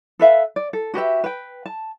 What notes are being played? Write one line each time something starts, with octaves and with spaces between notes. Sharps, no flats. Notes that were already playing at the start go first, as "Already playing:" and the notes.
A4 B4 E5 F5
D5
A4
F#4 G4 B4 E5
B4 G5
A5